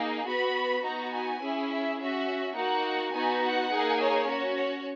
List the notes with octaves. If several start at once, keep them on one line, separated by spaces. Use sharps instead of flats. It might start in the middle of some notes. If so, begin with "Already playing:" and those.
Already playing: A#3 D#4 G#4
B3 F#4 B5
B3 D#4 F#4 A#5
G#5
C#4 E4 G#4
E5
C#4 F#4 E5
A#3 D#4 F#4 F#5
B3 D#4 F#4 G#5
F#5
A#3 D#4 G#4
C#5
C#4 F#4
C#5